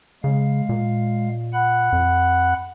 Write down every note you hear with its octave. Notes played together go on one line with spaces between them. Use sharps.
C#3 G#3 F5
A#2
F#5 B5 F#6
F2